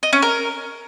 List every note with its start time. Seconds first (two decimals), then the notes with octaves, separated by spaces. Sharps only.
0.03 D#5
0.13 C#4
0.22 A#4